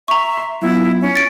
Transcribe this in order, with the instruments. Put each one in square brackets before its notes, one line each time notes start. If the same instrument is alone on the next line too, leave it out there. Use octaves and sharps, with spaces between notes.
[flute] E5 [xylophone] A#5 C#6
[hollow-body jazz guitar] C6
[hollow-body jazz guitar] F#3 B3 F4 [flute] E4
[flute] C#4
[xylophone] A6 D7